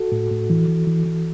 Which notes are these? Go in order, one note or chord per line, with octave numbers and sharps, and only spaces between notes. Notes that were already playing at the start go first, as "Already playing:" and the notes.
Already playing: F#4 A4
A2
A2
E3
E3
E3
E3